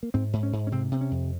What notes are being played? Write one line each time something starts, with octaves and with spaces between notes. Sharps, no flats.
A#3
G#2 C4
G#2
C#4
G#2
C#4
C3 C4
C3 C4
C#4
F2